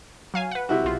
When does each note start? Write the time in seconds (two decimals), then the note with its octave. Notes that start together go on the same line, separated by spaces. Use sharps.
0.34 F#3 F5 G#5
0.51 B4 F#5
0.69 C3 E4 F#4
0.84 B1 F4